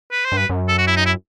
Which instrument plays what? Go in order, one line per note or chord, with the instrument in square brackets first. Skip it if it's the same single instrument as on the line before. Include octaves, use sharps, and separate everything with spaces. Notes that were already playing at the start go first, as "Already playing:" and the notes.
[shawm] B4
C5
[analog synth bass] G2
[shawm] B4
[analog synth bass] F#2
[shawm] A4
F#4
E4
D#4
E4